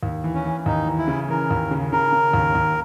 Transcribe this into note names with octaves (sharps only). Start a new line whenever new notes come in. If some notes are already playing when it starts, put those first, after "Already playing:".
D#2
E3
C#4
E3
D#2 D#4
E3
E4
C#3
E3 A#4
D#2
C#3
C#3 A#4
C#3
D#2
D#2